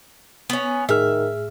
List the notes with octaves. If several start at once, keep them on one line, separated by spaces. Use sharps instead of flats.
B3 C#4
A2 D#3 G#4 E5 F6